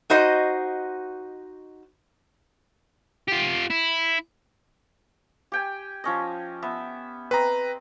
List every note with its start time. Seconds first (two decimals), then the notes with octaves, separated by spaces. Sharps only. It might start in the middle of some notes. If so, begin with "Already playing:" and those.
0.10 D#4 F#4 C5 D#5
3.28 F4 G4
3.70 E4
5.52 G4 G5 G#5
6.04 F3 C#4 D#5
6.62 B3 E5
7.31 C4 B4 D#5 A#5